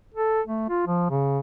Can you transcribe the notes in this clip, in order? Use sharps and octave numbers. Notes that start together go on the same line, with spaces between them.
A4
A3
F4
F3
C#3